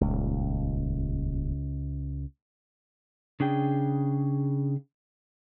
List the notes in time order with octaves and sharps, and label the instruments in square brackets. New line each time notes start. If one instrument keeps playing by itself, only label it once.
[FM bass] D#1 [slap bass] C#2
[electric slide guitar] C#3 D4 G#4 G5